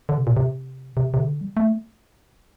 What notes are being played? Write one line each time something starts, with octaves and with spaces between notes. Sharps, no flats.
D3
C3
A#2
C3
C3
C3
D3
G3
A3